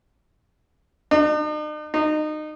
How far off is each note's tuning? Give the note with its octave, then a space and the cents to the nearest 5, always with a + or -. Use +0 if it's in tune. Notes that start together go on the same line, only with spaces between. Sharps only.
D#4 -45
D#4 -25